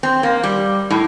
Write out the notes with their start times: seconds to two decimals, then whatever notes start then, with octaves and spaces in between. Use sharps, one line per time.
0.03 C4
0.23 A#3
0.43 G3
0.90 A2